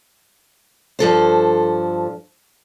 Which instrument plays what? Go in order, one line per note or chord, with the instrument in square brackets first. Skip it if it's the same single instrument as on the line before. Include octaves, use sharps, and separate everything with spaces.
[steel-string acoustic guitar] G2 F3 A4 C5